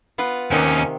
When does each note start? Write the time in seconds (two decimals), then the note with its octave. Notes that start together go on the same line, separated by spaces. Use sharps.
0.18 B3 F4 B4
0.51 D#2 C3 D#3 C#4